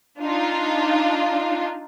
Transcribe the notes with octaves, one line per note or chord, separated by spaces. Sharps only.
D4 D#4 F4